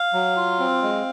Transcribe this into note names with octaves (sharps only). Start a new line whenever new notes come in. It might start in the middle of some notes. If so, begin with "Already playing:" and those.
Already playing: F5
F#3
F4
C4
G#3